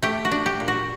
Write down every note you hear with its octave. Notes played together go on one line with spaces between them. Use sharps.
A3 G4
F#4
D4
G4
A#2
F#4